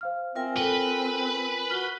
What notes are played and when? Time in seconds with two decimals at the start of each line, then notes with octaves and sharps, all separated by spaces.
0.01 C5 F5 F6
0.36 C4 F4 A#4 E5 G5 G#5
0.57 A4 B4 G5 G7
1.70 F#4 F6 B6 G7